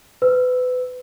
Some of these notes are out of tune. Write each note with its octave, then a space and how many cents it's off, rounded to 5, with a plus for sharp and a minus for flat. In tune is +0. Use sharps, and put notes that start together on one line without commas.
B4 +30 E6 +0